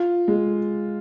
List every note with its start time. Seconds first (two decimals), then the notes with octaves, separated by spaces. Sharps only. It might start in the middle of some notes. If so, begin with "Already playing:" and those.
Already playing: F4
0.28 G#3